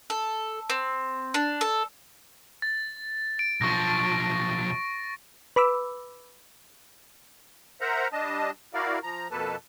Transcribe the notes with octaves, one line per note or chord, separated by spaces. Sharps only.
A4
C4
D4
A4
A6
D7
B1 F3 C#6 A#6
B4 B5 D6 E6
A#4 C5 E5 F#5 A#5
G3 D4 D#5 A5
E4 F#4 A#4 D5 F5
F3 A#5
F2 B2 A#3 A4 B4 A5